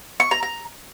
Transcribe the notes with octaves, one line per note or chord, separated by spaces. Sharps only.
C#6
A#5
A#5